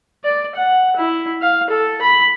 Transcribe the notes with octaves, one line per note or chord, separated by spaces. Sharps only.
D5
F#5
E4
F5
A4
B5